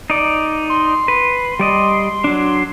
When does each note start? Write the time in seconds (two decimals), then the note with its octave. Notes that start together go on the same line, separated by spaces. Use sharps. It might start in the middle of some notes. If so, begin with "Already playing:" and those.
0.10 D#4 D5
0.70 C6
1.08 B4
1.60 G3 D5 D#5
2.24 F#3 D4